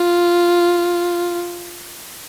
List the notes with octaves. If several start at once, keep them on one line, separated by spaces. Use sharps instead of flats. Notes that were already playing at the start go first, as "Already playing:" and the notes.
Already playing: F4